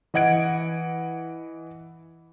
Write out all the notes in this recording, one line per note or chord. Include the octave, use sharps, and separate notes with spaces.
E3 D#5 F#5 G#6 D7